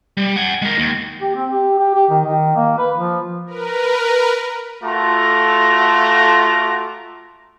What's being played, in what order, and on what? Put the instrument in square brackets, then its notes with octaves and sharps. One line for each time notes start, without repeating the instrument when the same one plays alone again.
[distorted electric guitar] G3
F#5 G#5
G#3 A#4
D#2
[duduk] G4
C4
G4
G4
G4
D#3
D#3
A#3
B4
F3
[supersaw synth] A#4 B4
[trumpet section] A3 F4 F#4 A4 A#5 D6